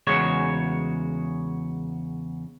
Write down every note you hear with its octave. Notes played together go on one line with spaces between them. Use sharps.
E2 C#3 G#3 F#4 C#5